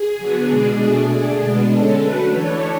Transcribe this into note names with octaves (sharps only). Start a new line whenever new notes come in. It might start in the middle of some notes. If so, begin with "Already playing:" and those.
Already playing: G#4
D3 F#3 B3
B2 G#3 D4 G#4
B2 A3 D4 G#4
D3 A3 D4
B2 G#3 B3 D4
D3 G#3 C#4 A4
D3 F#3 A3 B4
E3 A3 D4 C#5